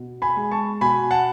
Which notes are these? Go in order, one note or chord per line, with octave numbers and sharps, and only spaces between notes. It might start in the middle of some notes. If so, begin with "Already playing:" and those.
Already playing: B2
G#5 B5
G#3
A5 C#6
B2 G#5 B5
F#5 A5